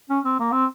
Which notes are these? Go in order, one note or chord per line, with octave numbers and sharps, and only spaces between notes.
C#4
C4
A#3
C4